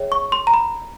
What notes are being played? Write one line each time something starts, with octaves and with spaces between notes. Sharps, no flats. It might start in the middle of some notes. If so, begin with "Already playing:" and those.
Already playing: G#4 C#5 E5 G5
C#6
C6
A#5
B5